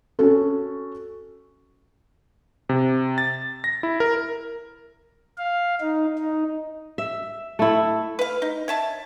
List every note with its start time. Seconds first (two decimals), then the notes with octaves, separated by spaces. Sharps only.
0.19 C#4 F#4 A4
2.69 C3
3.18 A6
3.64 A#6
3.83 E4
4.00 A#4
5.38 F5
5.81 D#4
6.19 D#4
6.98 E5
7.59 A3 E4
8.19 B4 F5
8.42 D#4
8.68 C#5 E5 A5